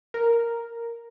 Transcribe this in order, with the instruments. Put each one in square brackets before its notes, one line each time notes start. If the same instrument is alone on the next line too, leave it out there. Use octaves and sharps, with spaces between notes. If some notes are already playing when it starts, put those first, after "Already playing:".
[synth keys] A#4